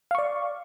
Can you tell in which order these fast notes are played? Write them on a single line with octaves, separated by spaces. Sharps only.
F5 C#6 D5